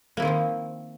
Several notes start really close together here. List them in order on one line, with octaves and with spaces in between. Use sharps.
A#3 E4 D#3 C4 F3